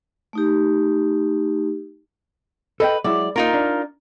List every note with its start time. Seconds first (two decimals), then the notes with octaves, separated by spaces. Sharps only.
0.33 A3 D#4 G4
2.80 A4 B4 D#5 G5
3.04 F#3 G#3 E4 D5
3.36 A#3 D#4 F4 A#4
3.53 D4